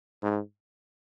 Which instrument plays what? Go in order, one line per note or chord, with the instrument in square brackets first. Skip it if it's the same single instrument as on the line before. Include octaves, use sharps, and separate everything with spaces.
[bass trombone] G#2